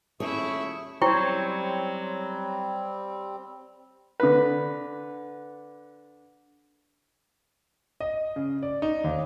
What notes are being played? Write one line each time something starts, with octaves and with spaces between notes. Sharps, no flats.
D#1 A3 E4 G#4 C#5 C#6
F#3 G3 C4 E4 C5 C#5 G5 C#6
D3 B4
D#5
C#3
D5
D#4
D#2